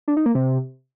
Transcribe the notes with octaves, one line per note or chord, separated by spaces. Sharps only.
D4
D#4
A#3
C3